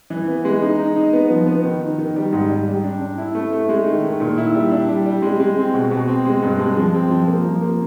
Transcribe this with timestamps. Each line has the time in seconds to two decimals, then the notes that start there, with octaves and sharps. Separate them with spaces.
0.10 E3
0.28 B3
0.45 G#3
0.62 D#4
0.79 D#4
0.96 D#4
1.13 B3
1.30 F3
1.47 B3
1.64 D#3
1.81 D#3
1.99 D#3
2.16 G3
2.33 G#2
2.50 G3
2.67 G3
2.84 D4
3.01 D4
3.18 E4
3.35 A3
3.52 A3
3.69 G#3
3.86 D#3
4.04 D#3
4.20 A#2
4.38 E4
4.54 G3
4.71 D4
4.89 G3
5.05 G3
5.22 G#3
5.40 G#3
5.57 C4
5.74 B2
5.91 B2
6.08 C4
6.25 G#3
6.42 G2
6.60 G#3
6.76 F3
6.94 C4
7.11 F3
7.28 A#3
7.45 F3
7.62 A#3